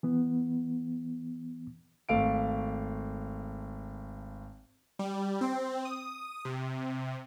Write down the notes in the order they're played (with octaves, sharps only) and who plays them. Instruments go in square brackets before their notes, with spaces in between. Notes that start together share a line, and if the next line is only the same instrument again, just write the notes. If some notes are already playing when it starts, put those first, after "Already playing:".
[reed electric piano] E3 B3
[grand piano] G#1 A3 F5 D7
[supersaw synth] G3
C4
D#6
C3